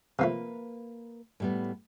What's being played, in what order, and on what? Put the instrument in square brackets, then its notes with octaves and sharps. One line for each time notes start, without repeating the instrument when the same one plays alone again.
[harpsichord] C3 F3 A3 [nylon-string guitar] A#3 B4
[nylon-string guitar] A2 G3 B3